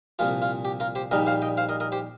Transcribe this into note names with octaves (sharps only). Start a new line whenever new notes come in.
C2 A#2 F3 F4
F4
G4
F4 A#4
G4 C5
A#1 A#2 G3 D#4 A#4 D#5
C5 F5
D#5 G5
C5 F5
A#4 D#5
A#4 D#5
G4 C5